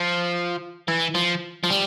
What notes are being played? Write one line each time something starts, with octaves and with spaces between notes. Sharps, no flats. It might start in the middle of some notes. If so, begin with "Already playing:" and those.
Already playing: F3
E3
F3
F3
G3